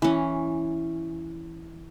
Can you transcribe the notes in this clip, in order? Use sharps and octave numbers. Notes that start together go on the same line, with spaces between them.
E3 C#4